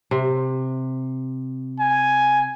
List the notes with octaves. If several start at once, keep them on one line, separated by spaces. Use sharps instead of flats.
C3
G#5